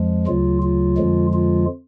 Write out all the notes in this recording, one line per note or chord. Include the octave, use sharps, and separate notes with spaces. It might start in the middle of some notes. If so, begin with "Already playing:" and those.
Already playing: F2 F3 G#3
D2 C#3 F#3 F4
F4
F2 D3 F3 G#3
F4